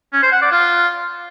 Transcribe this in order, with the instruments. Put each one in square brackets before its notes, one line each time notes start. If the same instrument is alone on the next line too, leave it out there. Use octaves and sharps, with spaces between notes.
[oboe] C#4
C5
F#5
D5
F4